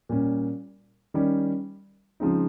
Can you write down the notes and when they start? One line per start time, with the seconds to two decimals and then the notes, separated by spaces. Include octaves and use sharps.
0.09 A#2 G3 C#4
1.14 D#3 G3 C#4
2.20 C#3 F3 G#3 C4 D#4